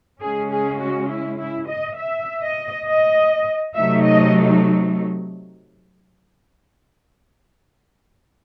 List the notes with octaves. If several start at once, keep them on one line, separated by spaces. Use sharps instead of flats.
C#3 G#3 C#4 G#4
G#4
F#4
E4
E4
D#5
E5
D#5
D#5
C3 F#3 A3 D#4 E5
D#5